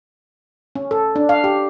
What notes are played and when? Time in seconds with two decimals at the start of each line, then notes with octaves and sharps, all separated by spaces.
0.76 C#4
0.91 A4
1.16 D4
1.29 F5
1.44 G4